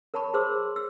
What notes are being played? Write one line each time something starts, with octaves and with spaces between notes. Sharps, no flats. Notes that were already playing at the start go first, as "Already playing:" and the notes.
A#4 C#5 A5 B5 C#6
G#4 A#4 C5 C6 D6 E6
E6